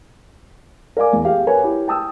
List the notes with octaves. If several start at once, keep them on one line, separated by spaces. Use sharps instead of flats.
A#4 D5 F5 G#5 D6
E2
G4 G#4 F5
A#4 B4 C#5 G#5
E4 G4
G5 A5 D#6 E6